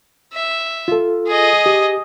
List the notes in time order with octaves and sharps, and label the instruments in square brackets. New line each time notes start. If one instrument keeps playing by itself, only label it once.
[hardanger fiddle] E5
[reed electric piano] F4 A4
[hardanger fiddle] G#4 D#5
[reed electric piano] G4